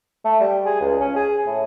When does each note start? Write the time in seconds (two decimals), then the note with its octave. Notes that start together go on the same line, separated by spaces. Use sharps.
0.24 A3
0.40 G3
0.65 G#4
0.81 C#2
1.01 C#4
1.15 G#4
1.47 A2